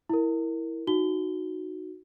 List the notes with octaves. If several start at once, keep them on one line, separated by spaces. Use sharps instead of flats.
E4 A#4
D#4 F#4 G7